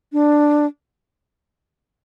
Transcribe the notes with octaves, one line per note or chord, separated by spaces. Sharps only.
D4